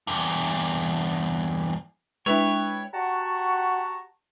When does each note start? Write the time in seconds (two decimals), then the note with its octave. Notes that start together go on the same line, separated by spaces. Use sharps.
0.07 E2 G2
2.26 G#3 D4 E4 B4 C#5 G5 F7
2.94 F#4 G4 F#5 A5 A#5 C#6